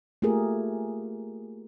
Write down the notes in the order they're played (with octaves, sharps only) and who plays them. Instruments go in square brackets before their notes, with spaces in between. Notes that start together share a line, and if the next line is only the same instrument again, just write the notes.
[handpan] A3 A#3 F4 G4 G#4 A#4